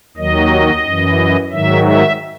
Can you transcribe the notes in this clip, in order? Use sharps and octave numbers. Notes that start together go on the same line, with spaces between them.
D#2 D#3 F#3 D#5
F#2 E3
G#2 D#3 F#3 E5
E5